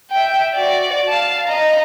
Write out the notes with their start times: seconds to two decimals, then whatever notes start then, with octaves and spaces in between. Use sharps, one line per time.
0.11 E5 G5
0.55 F#4 D5
1.08 F5 A5
1.48 D#5 A#5